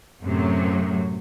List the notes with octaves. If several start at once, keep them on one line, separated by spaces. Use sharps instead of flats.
F#2 A2 C3 F#3